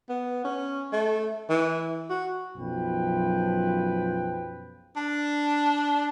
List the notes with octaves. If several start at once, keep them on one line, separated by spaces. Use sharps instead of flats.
B3
C#4
A3
E3
F#4
B1 F#2 F3 B4 G5
D4